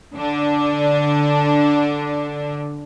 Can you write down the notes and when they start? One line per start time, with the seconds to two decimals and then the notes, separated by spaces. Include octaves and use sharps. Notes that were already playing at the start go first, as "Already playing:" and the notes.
0.14 D3 D4